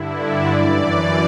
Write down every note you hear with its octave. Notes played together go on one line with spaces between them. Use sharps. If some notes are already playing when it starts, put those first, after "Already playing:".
Already playing: G2 D3 E4
D5
F#2 E3 D5